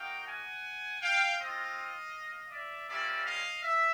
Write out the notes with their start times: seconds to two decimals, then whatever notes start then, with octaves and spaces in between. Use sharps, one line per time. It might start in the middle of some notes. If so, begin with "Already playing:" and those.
Already playing: A#3 D#4 F#4 F5 G5
0.26 F#5 G#5
1.01 F5 G5
1.38 C4 F4 D#5 F5
2.51 D5 E5
2.88 G3 A#3 C#4 F4 D5 E5
3.26 D#5 F5
3.63 E5